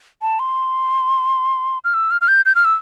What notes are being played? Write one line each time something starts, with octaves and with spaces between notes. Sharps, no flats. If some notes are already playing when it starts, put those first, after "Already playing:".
A5
C6
F6
E6
F6
F6
G6
G6
F6
E6